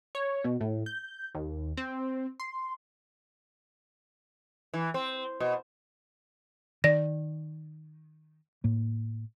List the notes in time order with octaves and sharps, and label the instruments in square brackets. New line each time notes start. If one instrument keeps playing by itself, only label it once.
[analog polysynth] C#5
B2
A2
G6
D#2
C4
C6
[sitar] E3
C4
B2
[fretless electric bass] D#3 [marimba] D5 A#6
[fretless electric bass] A2 A#3